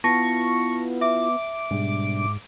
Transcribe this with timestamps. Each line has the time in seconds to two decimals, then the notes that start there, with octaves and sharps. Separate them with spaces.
0.04 B3 E4 F4 A5 C#6 A#6
1.01 E5 D6
1.71 G#2 B2 G3 D4